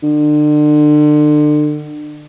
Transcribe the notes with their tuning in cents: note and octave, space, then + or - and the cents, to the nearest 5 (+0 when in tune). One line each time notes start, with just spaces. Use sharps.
D3 +35